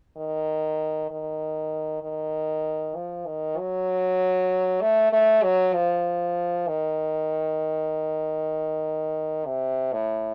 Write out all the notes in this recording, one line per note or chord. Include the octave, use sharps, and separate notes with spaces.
D#3
D#3
D#3
F3
D#3
F#3
A3
A3
F#3
F3
D#3
C3
A2